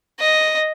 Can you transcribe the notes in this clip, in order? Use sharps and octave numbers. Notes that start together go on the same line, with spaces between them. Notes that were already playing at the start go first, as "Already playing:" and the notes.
D#5